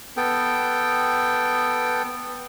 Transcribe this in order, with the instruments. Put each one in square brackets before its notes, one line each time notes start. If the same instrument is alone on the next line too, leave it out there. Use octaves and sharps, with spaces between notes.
[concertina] B3 A4 G5